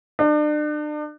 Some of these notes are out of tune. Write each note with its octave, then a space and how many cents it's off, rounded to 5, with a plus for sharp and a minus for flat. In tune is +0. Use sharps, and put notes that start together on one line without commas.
D4 +40